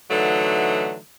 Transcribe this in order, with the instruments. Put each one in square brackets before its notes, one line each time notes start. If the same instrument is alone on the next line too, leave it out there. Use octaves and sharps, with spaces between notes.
[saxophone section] D3 E3 F#3 A3 D#4